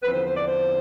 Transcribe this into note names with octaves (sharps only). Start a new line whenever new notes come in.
E2 D3 F3 C4 B4
C5
C5
D5
C5